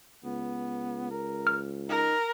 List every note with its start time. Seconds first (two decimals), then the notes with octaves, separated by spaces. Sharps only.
0.24 C#2 B3
1.11 A#4
1.47 F6
1.89 D#4 A#4